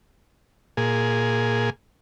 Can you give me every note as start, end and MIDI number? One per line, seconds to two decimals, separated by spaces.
0.77 1.70 46
0.77 1.70 68